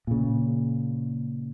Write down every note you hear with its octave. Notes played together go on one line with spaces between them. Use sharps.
A#2 C#3